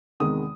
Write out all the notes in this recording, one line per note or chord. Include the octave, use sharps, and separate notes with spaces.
E2 C3 D#3 G#3 D#6